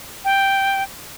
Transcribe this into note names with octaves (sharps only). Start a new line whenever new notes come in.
G5